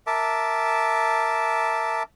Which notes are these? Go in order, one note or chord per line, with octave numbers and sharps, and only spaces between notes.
A#4 E5 A5 D6